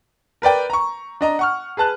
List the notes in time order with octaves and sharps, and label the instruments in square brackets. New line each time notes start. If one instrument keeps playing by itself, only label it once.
[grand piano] A#4 B4 D5 G5
A#5 C#6
D4 D#5 A#5
F#5 C#6 F6
G#4 B4 A5 F#6